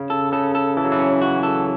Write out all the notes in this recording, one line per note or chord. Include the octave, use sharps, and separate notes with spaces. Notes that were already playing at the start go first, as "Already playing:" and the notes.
Already playing: C#3
A4
C#3 A4
A4
E3 A4
F#3
E3
C#4
F#4
A4